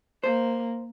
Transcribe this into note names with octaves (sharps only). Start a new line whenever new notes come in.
A#3 C5